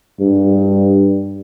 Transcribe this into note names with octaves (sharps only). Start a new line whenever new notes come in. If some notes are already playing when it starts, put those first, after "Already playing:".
G2